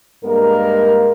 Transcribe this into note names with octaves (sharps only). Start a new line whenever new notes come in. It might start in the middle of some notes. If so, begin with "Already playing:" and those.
G2 G#3 A#3 A#4